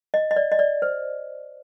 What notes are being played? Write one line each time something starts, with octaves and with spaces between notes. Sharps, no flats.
D#5
D#5
D5
D#5
D5
C5